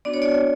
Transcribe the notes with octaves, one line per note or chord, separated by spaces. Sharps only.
B3 D4 F#4 D5
C#5
D5